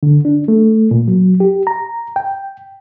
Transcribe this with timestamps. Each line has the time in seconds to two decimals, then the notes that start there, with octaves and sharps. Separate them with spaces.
0.03 D3
0.25 D4
0.48 A3
0.91 A#2
1.08 F#3
1.40 G4
1.67 A#5
2.16 G5